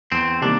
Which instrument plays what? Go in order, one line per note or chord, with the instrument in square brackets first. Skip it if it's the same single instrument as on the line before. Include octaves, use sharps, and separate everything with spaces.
[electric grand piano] E2 [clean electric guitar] C4
[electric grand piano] C3 D#3 G3 A#3 [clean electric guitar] D4